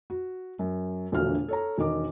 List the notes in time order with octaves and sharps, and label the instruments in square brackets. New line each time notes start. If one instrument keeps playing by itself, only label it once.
[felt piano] F#4
F#2
E1 A#1 D3 A3 F#4 F6
A4 C#5 A#5
E1 D#3 A#4 D#5 D6